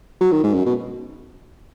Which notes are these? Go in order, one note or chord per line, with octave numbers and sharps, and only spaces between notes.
F#3
D#3
G#2
F#2
B2